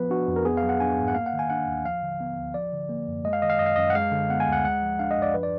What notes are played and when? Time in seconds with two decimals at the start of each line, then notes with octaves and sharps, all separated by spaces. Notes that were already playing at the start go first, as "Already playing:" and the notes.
Already playing: F3 B3 B4
0.10 D4 F#4
0.28 F2
0.36 A#4
0.45 B3 G#4
0.57 F#3 F5
0.69 F#5
0.80 D4 G#5
0.98 G#2
1.08 F#5
1.15 A#3 F5
1.26 F#5
1.33 D#3
1.39 G#5
1.49 D4 F#5
1.68 D#2
1.85 F3 F5
2.03 D3
2.20 B3
2.38 D2
2.54 F3 D5
2.73 D3
2.89 A#3
3.08 F#2
3.25 G#3 D#5
3.33 F5
3.42 D#3 D#5
3.50 F5
3.59 F#2 D#5
3.66 F5
3.76 F#2 D#5
3.90 F#5
3.95 G#3 F5
4.12 D3
4.30 B3 F#5
4.40 G#5
4.47 D2
4.52 F#5
4.65 G#3 F#5
4.82 F3
4.99 D4 F5
5.11 D#5
5.18 F#2 D5
5.34 F3 B4
5.43 D5